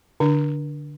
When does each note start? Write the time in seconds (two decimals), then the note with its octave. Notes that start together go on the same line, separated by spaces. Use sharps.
0.20 D3 D4